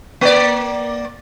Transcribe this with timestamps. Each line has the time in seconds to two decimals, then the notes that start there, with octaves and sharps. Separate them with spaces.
0.21 A#3 D5